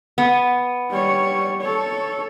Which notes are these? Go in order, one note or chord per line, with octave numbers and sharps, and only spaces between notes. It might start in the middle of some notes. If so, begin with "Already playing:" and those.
B3
G3 C#5
A4 C#5